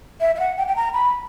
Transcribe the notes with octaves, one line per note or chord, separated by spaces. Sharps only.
E5
E5
F#5
G5
G5
A#5
B5